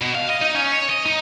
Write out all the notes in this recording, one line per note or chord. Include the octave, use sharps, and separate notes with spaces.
B2
F5
D#5
D#4
C#4
C#5
D#5
D#4